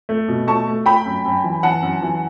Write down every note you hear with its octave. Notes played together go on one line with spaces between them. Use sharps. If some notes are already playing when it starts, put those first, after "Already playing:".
A3
B2
A3 A5 C#6
A3
A3 G5 B5
F#2
F#2
E3
E3 F#5 A5
F#2
E3